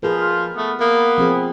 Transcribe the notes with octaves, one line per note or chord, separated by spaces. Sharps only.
F3 G#4 A#4 B4
F4
A3 B3
A#3 B3
F3 C4 G#4